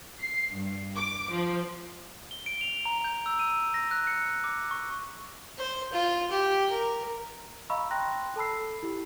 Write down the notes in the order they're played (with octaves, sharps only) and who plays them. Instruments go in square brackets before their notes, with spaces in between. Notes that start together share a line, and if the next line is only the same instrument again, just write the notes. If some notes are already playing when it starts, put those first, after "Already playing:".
[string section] C7
G2
D6
F3
[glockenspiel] G7
D7
F7
A#5
G6
E6
D#7
A#6
F#6
C#7
D6
C#6
[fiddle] C5
F4
G4
A#4
[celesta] D#5 F5 A#5 B5 C#6 E6
G5 A#5 C6 F#6 A#6
A4 A5 B5 E6 C7
E4 G4